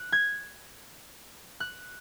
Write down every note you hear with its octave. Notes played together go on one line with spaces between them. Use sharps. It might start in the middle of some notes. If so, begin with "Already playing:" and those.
Already playing: F#6
G#6
F#6